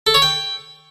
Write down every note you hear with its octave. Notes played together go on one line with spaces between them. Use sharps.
A4
C#5
G5